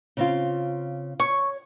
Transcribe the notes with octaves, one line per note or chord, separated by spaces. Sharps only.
C#3 C4 F4
C#5 C#6